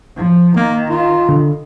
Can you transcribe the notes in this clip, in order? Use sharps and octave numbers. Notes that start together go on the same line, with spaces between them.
F3
D#3 A#3
F4
D3